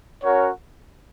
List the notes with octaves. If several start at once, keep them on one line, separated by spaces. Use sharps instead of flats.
C#4 F#4 A#4 C#5 F#5